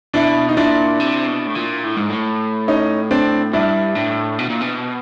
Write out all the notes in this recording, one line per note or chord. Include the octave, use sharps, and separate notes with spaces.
B2 D4 E4
D#4
A#2 D4 E4
C3
B2
A2
A#2
A2
G#2
A2
C#4 D#4
C4 D4
G2 D4 E4
A2
B2
A#2
B2